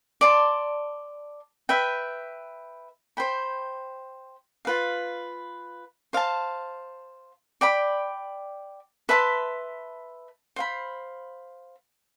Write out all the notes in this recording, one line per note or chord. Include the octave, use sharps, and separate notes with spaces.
D5 A5 C6
B4 E5 G5
C5 G5 B5
F4 B4 F5
C5 F5 A5
D5 G5 B5
B4 E5 A5 C6
C5 F5 B5